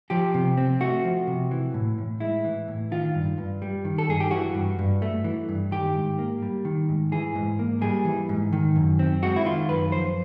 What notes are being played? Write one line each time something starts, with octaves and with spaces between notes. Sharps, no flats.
F3 G4
C3
C4
A3 F#4
F3
C3
E3
A2
A2
G#3 E4
E3
A2
D#3 F4
G2
G2
G3
D#3
A4
G2 G#4
G4
E3 F#4
G2
G2
A3
E3
G2
D#3 G4
G#2
A#3
G3
D#3
G#2
E3 G#4
G#2
A#3
G3 G#4
E3
G#2
D#3
F#2
C4
G#3 F#4
E4
D#3 F4
F#2 B4
F3 C5